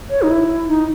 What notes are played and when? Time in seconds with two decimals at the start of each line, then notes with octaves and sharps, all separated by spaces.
0.10 C#5
0.22 D#4
0.30 E4
0.68 D#4